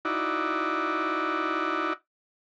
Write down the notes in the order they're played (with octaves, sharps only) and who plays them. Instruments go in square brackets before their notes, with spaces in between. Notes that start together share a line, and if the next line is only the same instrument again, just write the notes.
[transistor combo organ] D#4 E4 F#4 D5